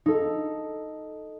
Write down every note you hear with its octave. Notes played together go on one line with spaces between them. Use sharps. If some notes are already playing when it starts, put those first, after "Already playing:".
D#4 A4